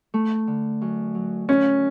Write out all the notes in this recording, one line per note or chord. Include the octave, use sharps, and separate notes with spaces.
A3
D3
F#2
F#3
F#2 C#4